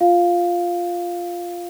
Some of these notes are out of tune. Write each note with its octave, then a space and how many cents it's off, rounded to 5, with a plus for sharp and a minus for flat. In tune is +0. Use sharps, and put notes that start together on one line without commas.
F4 +0 F5 +0